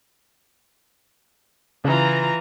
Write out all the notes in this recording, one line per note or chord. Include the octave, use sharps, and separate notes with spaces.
C#3 E3 F4 A#5